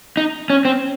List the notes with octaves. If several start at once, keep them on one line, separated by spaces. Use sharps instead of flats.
D#4
C#4
C4